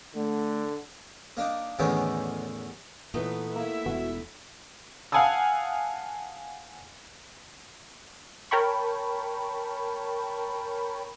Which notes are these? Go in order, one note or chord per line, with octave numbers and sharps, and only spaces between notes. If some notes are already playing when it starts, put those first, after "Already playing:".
D3 A3
A#3 D4 D#4
E2 A2 D3 D#3 B3 C#4
A#2 E3 A3 B3 D#4 B4
A#3 E4 E5
E1 B2 E3 F#4
F5 F#5 G#5 A5 D#6 E6
A#4 C#5 G5 A5 B5 C#6